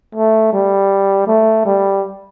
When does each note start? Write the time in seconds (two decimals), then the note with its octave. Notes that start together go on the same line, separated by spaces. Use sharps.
0.15 A3
0.53 G3
1.28 A3
1.66 G3